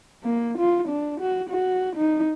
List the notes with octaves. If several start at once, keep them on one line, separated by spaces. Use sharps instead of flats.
A#3
F4
D4
F#4
F#4
D#4